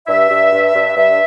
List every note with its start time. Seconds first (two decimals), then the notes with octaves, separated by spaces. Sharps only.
0.07 G2 E5
0.29 G2
0.52 G2
0.74 G2
0.96 G2 E5